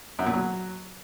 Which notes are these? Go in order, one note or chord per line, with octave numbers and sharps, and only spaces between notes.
F#2
A#2
F#3